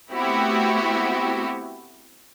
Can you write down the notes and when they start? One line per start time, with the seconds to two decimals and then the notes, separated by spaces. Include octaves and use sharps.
0.10 A3 B3 C4 E4 F#4 G4